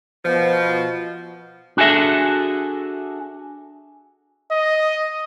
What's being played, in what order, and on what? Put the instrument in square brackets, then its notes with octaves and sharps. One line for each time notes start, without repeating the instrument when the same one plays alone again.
[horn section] B2 F3
[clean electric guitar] D4 F#4 G#4 A4 E5
[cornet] D#5